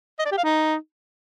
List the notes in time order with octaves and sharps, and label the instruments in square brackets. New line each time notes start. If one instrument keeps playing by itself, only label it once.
[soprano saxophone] D#5
D5
G4
F5
D#4